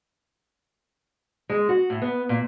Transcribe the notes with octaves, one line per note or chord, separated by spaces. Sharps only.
G#3
F#4
A2
B3
A#2